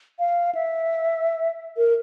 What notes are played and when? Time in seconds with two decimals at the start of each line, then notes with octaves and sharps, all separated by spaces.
0.19 F5
0.55 E5
1.77 A#4